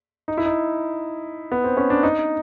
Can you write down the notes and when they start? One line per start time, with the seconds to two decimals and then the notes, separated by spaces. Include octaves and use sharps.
0.28 D#4
0.38 E4
0.46 D#4
1.52 B3
1.64 C4
1.77 C#4
1.90 D4
2.03 D#4